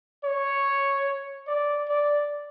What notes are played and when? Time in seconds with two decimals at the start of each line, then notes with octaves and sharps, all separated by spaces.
0.24 C#5
1.47 D5
1.88 D5